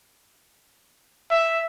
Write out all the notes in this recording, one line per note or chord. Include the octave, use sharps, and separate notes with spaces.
E5